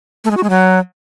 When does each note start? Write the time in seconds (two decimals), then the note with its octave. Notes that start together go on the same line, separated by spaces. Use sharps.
0.24 A3
0.31 G#3
0.37 F#4
0.43 G#3
0.50 F#3